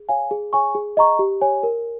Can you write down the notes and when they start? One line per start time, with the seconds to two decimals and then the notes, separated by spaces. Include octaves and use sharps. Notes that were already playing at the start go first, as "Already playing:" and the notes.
Already playing: G#4
0.09 C#5 F5 G#5
0.31 G#4
0.53 C#5 G#5 C#6
0.75 G#4
0.97 D#5 A#5 C#6
1.19 G4
1.41 C#5 G#5
1.63 A#4